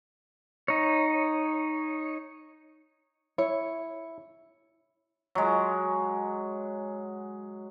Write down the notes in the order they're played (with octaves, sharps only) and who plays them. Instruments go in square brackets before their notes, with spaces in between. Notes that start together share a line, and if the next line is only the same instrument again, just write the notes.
[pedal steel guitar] D#4 C#5
[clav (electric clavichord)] E4 [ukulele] C#5
[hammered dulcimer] F#3 G#3